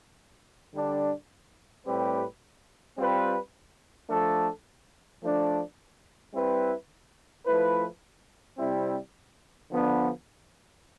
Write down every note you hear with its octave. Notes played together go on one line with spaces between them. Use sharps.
D3 G3 D4
A2 G3 C4 G4 B4
G3 C4 F4 B4
F3 A3 D4 A4
F3 A3 D4
G3 C4 E4 B4
F3 A3 E4 B4
C3 G3 C4 E4
D3 F3 B3 D4